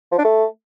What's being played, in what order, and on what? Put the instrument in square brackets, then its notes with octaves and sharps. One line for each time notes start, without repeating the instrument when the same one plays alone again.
[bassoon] F3
D4
A3